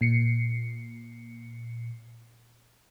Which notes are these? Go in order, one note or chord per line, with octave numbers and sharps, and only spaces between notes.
A#2 C7 C#7